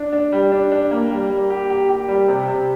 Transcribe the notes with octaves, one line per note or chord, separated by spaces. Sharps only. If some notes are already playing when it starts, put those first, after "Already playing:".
Already playing: D4
D4
G3
D4
D4
A#3
G3
G3
G4
G4
G4
G3
C3
C3